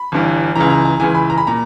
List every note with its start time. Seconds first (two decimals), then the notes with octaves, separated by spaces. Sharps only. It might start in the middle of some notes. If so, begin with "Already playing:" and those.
Already playing: B5
0.12 G1 G2 E3
0.55 C#2 C#3 E3 A#5
0.70 A#5
0.85 A#5
1.00 C#2 C#3 E3 G#5
1.15 B5
1.30 A#5
1.38 B5
1.47 A#2 A#5